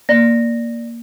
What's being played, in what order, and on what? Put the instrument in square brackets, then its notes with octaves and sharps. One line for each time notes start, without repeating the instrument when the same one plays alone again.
[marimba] A#3 [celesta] D5 A#6